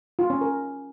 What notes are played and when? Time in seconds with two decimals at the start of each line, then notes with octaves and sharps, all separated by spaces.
0.19 F4
0.30 C#4
0.41 A#4